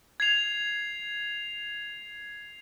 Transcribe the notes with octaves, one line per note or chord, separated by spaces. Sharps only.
G#6 C7 F7